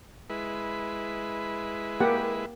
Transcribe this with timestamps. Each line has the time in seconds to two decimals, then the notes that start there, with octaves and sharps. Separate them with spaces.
0.30 G#3 E4 B4
2.00 A#3 G4 F#5